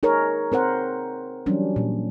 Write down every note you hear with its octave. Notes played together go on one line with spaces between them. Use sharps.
D#4 G#4 A#4 C#5
C4 A#4 C5 F#5
E3 F#3 G3 C#4 D4
A#2